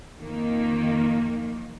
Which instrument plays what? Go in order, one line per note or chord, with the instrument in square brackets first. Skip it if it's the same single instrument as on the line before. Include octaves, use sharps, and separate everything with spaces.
[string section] F2 D#3 A#3